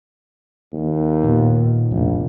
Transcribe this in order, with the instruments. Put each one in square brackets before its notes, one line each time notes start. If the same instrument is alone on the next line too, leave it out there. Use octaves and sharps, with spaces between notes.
[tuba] D#2
[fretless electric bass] A#2 B3
[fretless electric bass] F1 [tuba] A#1